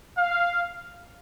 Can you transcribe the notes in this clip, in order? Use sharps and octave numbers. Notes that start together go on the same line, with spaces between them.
F5